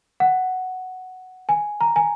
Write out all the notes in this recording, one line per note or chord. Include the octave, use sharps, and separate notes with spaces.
F#5
G#5
A#5
G#5